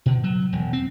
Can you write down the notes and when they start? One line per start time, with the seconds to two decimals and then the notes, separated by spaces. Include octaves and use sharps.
0.06 B2
0.24 F#3
0.52 E1
0.73 C4